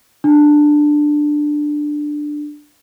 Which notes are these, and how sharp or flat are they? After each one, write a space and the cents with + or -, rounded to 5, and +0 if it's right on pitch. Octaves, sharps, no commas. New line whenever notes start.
D4 +10